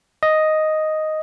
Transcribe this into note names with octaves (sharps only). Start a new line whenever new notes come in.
D#5